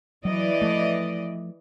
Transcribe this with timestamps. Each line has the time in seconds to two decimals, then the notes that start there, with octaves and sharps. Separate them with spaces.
0.25 E3 F#3 D5 D#5
0.62 F3 A3